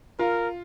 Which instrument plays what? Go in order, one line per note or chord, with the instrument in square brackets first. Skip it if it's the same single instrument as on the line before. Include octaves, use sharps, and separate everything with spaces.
[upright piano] F4 [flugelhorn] A#4